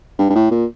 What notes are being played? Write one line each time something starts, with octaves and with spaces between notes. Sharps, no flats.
G2
G2
A2
A#2